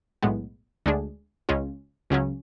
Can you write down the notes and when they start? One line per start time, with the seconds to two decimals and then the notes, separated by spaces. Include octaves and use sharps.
0.22 B1 A2 G#3 B3
0.86 D2 D3 G#3 D4 G#4
1.49 C#2 C#3 G#3 C#4 F4
2.10 C#2 C#3 F#3 C#4